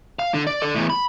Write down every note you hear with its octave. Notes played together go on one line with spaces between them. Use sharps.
F5
D3
D5
A4 D5
E2 A2
B5